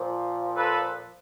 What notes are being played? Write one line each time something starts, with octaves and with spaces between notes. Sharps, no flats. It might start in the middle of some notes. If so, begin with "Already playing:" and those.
Already playing: A#2 F3
A4 B4